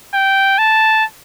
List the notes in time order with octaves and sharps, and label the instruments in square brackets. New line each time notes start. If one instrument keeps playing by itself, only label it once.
[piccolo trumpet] G5
A5